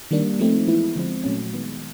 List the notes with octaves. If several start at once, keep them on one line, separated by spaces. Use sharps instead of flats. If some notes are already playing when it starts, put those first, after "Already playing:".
D#3 G3 A#3 D4
F3 A3 C4 D#4
E3 G#3 B3 E4
D3 F3 G#3 C4
A#2 F#3 A3 C#4
D#3 G#3 B3